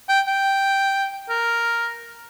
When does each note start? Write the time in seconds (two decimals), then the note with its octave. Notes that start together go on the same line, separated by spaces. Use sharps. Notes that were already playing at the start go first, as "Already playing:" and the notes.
0.09 G5
0.27 G5
1.29 A#4